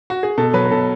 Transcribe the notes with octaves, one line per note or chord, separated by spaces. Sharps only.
F#4
G#4
B2 A4
F#3 B4
B4
B2 A4